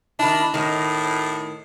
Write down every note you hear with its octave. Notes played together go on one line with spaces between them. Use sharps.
D#3 D4 E4
A2 D#3